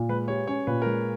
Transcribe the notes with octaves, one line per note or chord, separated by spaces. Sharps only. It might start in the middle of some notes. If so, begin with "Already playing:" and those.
Already playing: A#2
G#3 B4
G4 C#5
C#4 C#5
A#2 B4
A#4
G#3